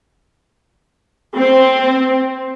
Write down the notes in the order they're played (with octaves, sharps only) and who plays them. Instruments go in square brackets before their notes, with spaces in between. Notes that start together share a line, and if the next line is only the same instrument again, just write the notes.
[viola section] C4